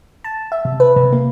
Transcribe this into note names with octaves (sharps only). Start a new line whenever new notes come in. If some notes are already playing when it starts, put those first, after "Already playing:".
A5
E5
C3
B4
C3
A#3